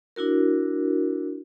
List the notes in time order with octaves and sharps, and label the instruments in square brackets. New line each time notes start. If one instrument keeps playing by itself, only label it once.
[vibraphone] D4 E4 F#4 A#4